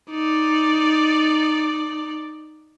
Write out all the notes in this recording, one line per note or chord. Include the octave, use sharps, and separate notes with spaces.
D#4 D5